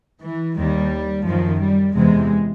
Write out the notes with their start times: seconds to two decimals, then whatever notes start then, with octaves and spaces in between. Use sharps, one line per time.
0.22 E3
0.57 D#2 D#3 G3
1.26 F#2 D#3 F3
1.61 G3
1.95 E2 C3 E3 G#3